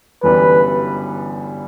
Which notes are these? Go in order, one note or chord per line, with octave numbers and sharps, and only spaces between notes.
G1 F#2 E3 G3 B4